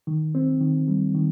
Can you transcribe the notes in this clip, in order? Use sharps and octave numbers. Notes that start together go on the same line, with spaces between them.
D#3
C4
D#3
G3
D#3